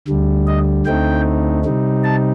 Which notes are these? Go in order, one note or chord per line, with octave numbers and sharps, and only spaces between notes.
D2 D3 G3
D#5
D2 D3 A3 C4 D#4 G5
C3 G3 C4 D#4
A5